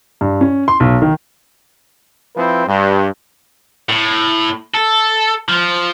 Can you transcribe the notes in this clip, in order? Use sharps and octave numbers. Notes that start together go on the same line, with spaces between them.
G2
C#4
C6
B1
D#3
F3 C4 E4 B4
G2
A2
A4
F3